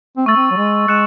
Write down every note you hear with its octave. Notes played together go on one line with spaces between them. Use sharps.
C4
A3 C#6 E6 A6
C4
F#3
G#3
G#3 F#6 C#7 E7